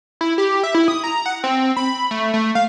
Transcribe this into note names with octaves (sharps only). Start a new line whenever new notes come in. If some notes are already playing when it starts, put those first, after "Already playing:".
E4
G4
E5
E4
D#6
A#5
F#5
C4
B5
A3
A3
F5